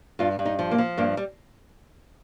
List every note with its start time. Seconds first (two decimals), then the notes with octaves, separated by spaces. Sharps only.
0.19 G2 F4
0.39 G2
0.45 D#4
0.59 F3
0.71 A#3
0.78 F3
0.98 G2 A#3
1.17 G3